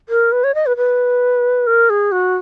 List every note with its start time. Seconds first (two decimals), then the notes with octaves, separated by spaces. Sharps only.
0.09 A#4
0.32 B4
0.44 C#5
0.55 D#5
0.66 B4
0.77 B4
1.67 A#4
1.90 G#4
2.12 F#4